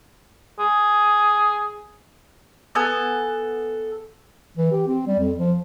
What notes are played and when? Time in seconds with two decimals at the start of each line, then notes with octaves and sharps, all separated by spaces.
0.59 G#4
2.75 B3 A4 G#5
4.57 E3
4.72 G4
4.87 C4
5.07 G3
5.19 F2
5.37 F3